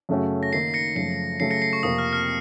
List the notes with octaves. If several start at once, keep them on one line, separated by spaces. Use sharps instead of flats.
F#2 C#3 A3 C#4 F#4
A#6
D#3 A#3 D#4 C7
A#6 C#7
F#2 C#3 F3 A3 C7
C#3 F#3 A3 C7
A#6 C#7
C7
C#6
F2 C3 F3 A#3 D#6
F6
F6